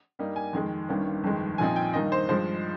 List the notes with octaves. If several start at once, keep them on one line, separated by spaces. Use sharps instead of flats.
G2 G3 A#3 D#4
G#5
F2 D#3 G#3
G1 G2 D#3 A#3 C#4
G1 F2 D#3 G#3
A#1 A#2 F3 C4 D#4 G#5
G5
G2 D#3 A#3 D#4 D#5
C5
G2 F3 G#3 C5